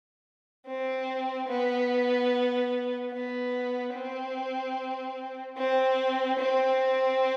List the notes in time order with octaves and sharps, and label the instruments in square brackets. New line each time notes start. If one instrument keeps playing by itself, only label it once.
[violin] C4
B3
B3
C4
C4
C4